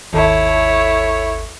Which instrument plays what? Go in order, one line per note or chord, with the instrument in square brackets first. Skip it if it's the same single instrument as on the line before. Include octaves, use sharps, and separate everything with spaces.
[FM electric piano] G#1 D#2 A4 [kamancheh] E4 C#5